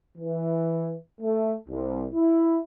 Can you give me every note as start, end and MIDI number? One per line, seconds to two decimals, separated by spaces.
0.18 0.95 52
1.21 1.54 57
1.68 2.06 36
2.13 2.58 64